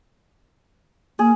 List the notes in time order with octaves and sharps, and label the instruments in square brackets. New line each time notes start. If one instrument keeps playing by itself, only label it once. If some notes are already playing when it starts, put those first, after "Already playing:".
[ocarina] A#3 [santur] G#4